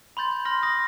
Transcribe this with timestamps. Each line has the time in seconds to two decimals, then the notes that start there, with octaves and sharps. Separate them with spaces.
0.17 B5 C6 G6 A6
0.45 C6 F6 A#6
0.63 D#6 A#6